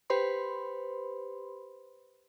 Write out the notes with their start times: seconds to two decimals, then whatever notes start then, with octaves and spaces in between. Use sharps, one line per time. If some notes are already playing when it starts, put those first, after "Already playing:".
0.10 G4 B4 C5 B5 C6